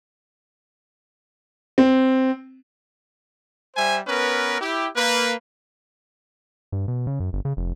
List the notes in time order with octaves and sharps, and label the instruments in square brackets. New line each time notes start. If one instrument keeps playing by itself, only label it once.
[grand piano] C4
[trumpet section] G3 C5 E5 G#5
B3 C#4 A#4 B4
E4 G4
A#3 B4
[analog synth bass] G2
B2
C#3
F#2
G1
C#3
F1